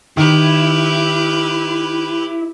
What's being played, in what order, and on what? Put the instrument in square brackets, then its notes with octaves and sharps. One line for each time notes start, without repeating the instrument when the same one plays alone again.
[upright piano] D#3 [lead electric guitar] E4 [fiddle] G4 B4